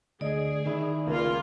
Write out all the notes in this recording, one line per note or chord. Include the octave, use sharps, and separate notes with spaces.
D2 G#4 D5 D#5
D#3 E4
C#2 A#3 F4 A#4